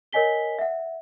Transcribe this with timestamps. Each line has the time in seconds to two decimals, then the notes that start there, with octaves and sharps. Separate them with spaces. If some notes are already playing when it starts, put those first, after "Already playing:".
0.13 A#4 C#5 D#5 G#5 B6 G7
0.59 E5 F#5